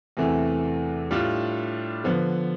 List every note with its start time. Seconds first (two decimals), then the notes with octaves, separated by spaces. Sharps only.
0.17 E2 C3 E3 A3
1.11 A2 G3 D4 F4
2.04 D3 F3 B3